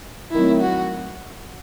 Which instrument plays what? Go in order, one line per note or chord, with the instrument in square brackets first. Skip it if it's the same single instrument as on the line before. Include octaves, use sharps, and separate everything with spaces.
[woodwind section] D#3 F#3 A3 C4 [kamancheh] E4
[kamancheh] F#4